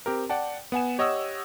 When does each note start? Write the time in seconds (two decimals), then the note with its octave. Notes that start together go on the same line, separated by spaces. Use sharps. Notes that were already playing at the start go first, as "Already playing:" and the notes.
0.06 C4 G4 A#4
0.29 D5 F#5 G5 A5
0.72 B3 F#5 G#5 E7
0.98 G4 C#5 D#5 F#5 D#6 E6